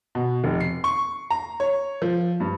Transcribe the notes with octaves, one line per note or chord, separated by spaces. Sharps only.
B2
F1
C7
C#6
A#5
C#5
F3
G2